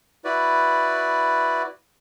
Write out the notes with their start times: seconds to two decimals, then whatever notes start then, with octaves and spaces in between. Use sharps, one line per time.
0.25 E4 F#4 B4 D5